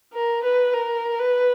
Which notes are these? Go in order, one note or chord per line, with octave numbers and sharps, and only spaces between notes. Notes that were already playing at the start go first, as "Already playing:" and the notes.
A#4
B4
A#4
B4